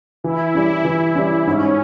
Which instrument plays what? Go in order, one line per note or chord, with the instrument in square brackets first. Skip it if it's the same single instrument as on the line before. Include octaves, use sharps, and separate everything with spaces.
[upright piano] E3 [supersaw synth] E4
[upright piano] G3 C#4
E3
G3 C#4
[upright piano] G#2 [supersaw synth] C#4